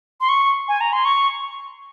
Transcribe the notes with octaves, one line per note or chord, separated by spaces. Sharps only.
C6
C#6
G#5
A#5
C6
C#6